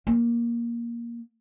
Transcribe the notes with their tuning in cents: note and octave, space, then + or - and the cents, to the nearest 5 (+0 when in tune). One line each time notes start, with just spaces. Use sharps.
A#3 +10